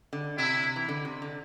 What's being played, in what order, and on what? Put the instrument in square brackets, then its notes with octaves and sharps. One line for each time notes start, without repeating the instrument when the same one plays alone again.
[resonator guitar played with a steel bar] D3
[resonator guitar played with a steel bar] C3 [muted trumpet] E4
[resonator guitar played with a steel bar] C3
E3
D3
C3
D3